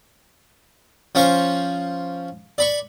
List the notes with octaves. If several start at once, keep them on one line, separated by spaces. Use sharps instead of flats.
F3 C#4 F4 C5 C#6
D5 B5 C#6